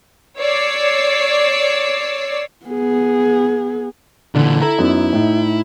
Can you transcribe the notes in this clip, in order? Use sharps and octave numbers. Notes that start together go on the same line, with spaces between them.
C#5 D5 D6 E6 C7
B3 G#4
A#2 D3 E3
E4 A4 E5 A#5
F#2 B3 D#4
A2 D#4